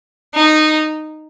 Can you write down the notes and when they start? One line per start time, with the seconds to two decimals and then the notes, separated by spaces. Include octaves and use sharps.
0.34 D#4